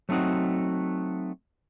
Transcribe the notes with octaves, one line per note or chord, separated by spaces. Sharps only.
F#3 A3 C4 D#4 F#4